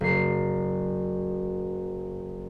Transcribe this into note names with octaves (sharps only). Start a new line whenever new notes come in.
F#1 C7